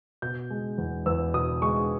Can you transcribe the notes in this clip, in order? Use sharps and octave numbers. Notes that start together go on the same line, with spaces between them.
B2 G6
G#3
E2
E2 E6
B2 D#6
G#3 C#6